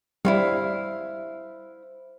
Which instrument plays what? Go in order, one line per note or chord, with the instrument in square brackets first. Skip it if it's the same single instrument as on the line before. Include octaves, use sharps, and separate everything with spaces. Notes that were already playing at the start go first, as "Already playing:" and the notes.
[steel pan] G3 [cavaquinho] E4 F4 F5 [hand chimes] C5 E5